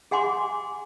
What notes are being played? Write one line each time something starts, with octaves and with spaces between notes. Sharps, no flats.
G#4 F#5 G#5 C6 D6